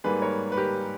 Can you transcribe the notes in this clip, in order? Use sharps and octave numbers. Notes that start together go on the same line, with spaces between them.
G#2 G3 A#3 G#4 B4
A#4 C#5
B4
G4 A#4